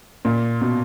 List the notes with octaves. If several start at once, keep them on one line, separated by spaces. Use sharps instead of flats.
A#2
B2